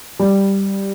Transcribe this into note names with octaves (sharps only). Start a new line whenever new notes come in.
G3